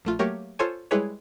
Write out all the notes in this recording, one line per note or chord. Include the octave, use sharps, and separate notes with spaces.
A#1 A3 F4
F#3 A3 A#3 G4 A#4 C#5
F4 A4 C5 C#5 G#5
G3 G#3 E4 G#4 B4 C#5